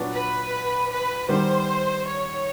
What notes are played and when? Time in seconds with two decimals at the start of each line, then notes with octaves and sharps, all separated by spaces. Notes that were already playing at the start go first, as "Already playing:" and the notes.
Already playing: A#2 F#3 B3 D4 F#4
0.13 B4
0.90 B4
1.28 D#3 G3 B3 C5
2.05 C#5